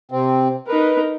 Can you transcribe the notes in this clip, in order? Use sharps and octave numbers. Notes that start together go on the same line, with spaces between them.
C3 C4
D#4 A#4 B4